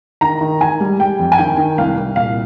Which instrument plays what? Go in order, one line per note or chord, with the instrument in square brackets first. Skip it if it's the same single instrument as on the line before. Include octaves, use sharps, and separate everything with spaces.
[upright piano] D#3 A#5
D#3
D#3 G#5
G3
G3 G5
F2
G#5
D#3 G5
D#3
C2 F5
C2
A#2 F5